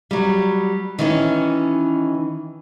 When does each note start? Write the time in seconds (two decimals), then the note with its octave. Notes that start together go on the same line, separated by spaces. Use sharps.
0.11 F#3 G3
0.99 D#3 E3 C#4